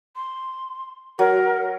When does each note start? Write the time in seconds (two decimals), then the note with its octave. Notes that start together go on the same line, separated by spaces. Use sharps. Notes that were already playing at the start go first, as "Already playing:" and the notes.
0.16 C6
1.19 F#3 A#4